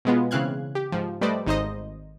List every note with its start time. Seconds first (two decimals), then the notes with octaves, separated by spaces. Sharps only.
0.05 B2 G#3 B3 F4
0.31 C#3 E3 C4 F5 F#6 G#6
0.75 G4
0.92 G#2 F3
1.21 G3 A3 B4 C5 D5 D#5
1.46 G#1 D#4 C5 D#5